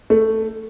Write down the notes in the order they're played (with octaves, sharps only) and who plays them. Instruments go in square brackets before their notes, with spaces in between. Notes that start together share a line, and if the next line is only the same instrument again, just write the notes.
[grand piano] A3